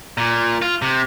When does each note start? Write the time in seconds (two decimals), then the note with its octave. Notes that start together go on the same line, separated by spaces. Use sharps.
0.18 A#2
0.62 F4
0.82 C3